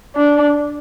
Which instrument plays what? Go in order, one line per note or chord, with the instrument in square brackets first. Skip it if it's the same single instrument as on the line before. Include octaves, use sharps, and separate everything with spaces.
[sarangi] D4